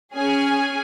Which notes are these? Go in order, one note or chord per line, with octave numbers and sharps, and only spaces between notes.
C#4 G#4 G#5